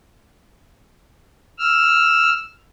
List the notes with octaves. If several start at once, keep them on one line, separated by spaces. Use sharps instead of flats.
E6 F6